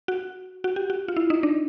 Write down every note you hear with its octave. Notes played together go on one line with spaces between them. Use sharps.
F#4
F#4
G4
F#4
F4
E4
D#4
D4